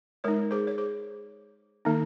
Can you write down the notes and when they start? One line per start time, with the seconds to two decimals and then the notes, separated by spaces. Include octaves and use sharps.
0.24 G#3 D#4 A#4 C#5
0.51 G#4 C5
0.67 C#5
0.78 G#4 C5
1.85 D#3 A#3 D#4